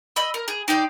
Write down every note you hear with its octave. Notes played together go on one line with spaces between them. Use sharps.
D#5 B5 E6
A#4
G#4
D#4 G4 D5 C6